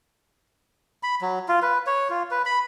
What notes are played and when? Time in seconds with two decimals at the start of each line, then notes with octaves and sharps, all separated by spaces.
1.03 B5
1.22 F#3
1.49 F4
1.62 B4
1.87 C#5
2.10 F4
2.31 B4
2.45 B5